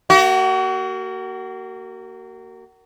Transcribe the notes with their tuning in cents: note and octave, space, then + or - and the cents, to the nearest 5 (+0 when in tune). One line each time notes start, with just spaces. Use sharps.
A#3 -20 F#4 +35